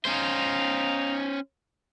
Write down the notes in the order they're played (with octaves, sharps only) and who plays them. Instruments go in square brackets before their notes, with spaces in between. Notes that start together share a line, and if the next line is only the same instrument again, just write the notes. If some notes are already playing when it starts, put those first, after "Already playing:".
[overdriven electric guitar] C#4 C5 [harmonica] D#4 F5